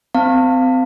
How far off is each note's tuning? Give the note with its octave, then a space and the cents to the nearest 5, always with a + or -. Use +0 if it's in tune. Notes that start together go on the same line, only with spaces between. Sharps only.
C4 -30 F5 +0 A5 +35